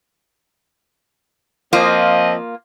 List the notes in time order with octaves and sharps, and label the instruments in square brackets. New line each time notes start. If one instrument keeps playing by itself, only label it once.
[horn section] F3 C4 D#5 [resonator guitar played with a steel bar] A#3 F4